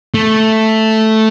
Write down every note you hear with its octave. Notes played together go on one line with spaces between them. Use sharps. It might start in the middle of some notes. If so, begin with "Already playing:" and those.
A3